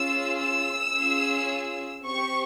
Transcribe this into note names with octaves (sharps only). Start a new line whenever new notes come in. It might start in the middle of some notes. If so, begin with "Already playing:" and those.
Already playing: C#4 F4 G#4 E6
E6
C#4 F4 G#4
C4 G4 C#6